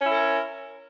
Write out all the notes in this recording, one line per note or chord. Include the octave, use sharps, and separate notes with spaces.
C#4 E4 A#4